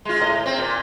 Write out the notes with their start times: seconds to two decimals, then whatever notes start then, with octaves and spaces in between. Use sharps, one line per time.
0.05 G#3 F4
0.20 A2 D#5
0.46 C4
0.58 A#2